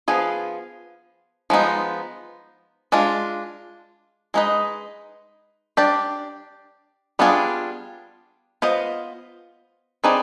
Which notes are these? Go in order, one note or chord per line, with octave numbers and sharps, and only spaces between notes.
F3 B3 F4 G#4
F3 G#3 B3 D#4
G#3 D4 F4
G#3 B3 D#4 B4 D#5
D4 G4 D5
G3 B3 D4 F4 G#4
B3 F4 C5 D#5
C4 D#4 G#4 B4 D5